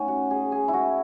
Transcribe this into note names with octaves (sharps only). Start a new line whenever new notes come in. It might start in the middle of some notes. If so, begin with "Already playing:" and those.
Already playing: A3 B3 C#4 D#4
F#4
G#4
G#4
E4
F#4